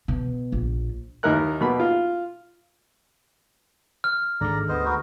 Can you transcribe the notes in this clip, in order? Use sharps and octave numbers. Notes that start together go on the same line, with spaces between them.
B2
A#1
D#2 D#4 E4 A#4 F#6
B2 A#3 B5
F4
F6
G#1 A2 D3 G#3 D4 D5 A#5
D2 B3 C5 D#5
F#4 A#4 B4